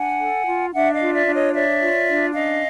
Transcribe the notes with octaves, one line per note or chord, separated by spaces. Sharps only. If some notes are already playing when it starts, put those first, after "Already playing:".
Already playing: D4 F#5 G#5
A4
F4
D4 E5 F#5
D#5 F5
F4
D5 E5
D4
C#5 D#5
C#5 D5 E5
F4
D4
C#4 D#5 F5